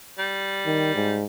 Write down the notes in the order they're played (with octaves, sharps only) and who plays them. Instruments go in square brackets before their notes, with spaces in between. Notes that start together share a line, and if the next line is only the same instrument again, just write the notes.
[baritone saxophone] G3
[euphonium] D#3
G#2